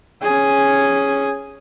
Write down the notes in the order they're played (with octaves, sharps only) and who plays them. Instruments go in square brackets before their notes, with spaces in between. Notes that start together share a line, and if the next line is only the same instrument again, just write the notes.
[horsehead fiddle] C#4 G#4